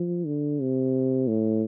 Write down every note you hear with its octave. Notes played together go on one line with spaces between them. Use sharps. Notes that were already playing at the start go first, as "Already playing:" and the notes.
Already playing: F3
D3
C3
A2